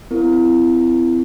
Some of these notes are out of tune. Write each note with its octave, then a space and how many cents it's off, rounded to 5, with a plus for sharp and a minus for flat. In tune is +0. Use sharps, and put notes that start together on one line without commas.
C4 -25 E4 +25 A#4 -25